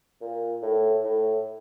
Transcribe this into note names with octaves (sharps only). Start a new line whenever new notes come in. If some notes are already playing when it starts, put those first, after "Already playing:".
A#2
A2
A2